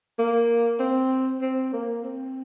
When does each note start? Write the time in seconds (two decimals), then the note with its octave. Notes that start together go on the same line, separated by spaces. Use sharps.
0.19 A#3
0.80 C4
1.42 C4
1.73 A#3
2.04 C4